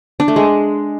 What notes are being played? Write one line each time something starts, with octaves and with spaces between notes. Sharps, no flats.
D4
A3
G#3